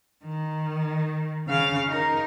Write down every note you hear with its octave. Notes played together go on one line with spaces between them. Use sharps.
D#3
C#3 F5
D#4 A#4